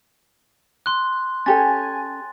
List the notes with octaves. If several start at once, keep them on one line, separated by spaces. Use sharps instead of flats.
C6 F#6
C#4 G4 A4 G#5 A6